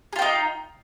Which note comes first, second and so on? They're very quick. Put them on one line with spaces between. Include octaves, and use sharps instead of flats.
G#4 F4 G5 D#4